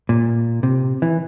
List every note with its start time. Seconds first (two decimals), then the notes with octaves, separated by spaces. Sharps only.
0.09 A#2
0.63 C3
1.02 E3